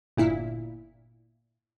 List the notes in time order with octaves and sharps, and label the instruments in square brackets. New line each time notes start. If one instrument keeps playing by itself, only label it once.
[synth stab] G1 A#2 E4